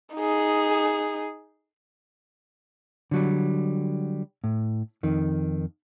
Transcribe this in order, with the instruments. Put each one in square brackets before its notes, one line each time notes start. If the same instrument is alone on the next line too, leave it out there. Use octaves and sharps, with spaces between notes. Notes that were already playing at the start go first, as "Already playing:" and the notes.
[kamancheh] D#4 G#4
[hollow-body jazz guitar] D3 F#3 G3
A2
F2 D#3